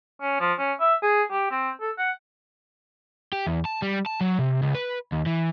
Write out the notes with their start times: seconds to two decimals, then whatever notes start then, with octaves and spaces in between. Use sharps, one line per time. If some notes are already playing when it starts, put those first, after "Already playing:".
0.21 C#4
0.40 F3
0.59 C#4
0.80 E5
1.03 G#4
1.31 G4
1.51 C4
1.81 A4
1.98 F#5
3.32 G4
3.47 E2
3.65 A5
3.82 G3
4.06 A5
4.21 F#3
4.39 C3
4.62 C#2
4.75 B4
5.12 D#2
5.26 E3